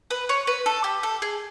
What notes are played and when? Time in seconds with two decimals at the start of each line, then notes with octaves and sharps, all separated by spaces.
0.10 B4
0.29 C#5
0.47 B4
0.66 A4
0.84 G4
1.03 A4
1.22 G#4